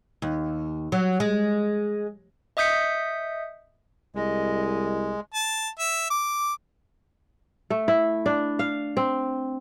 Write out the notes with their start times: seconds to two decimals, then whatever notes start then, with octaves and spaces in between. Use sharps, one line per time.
0.22 D#2
0.92 F#3
1.20 G#3
2.57 D#5 E5 D#6 G6 B6 C#7
4.15 C2 G#3 D#5
5.33 A5
5.79 E5
6.10 D6
7.70 A3
7.88 E4
8.26 D4
8.59 F5
8.97 C4